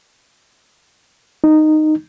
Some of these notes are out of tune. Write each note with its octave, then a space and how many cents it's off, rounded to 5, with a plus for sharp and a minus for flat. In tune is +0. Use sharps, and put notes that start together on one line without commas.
D#4 -10